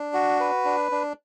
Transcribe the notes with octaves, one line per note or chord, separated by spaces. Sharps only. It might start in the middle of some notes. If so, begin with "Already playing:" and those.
Already playing: D4
F#4
B4
D4
D4